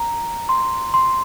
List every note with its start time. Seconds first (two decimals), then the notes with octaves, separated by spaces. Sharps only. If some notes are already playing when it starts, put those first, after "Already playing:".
Already playing: A#5
0.49 C6
0.94 C6